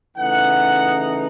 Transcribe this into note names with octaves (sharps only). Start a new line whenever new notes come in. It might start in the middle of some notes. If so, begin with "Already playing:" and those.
C#3 E3 A3 D#4 F#5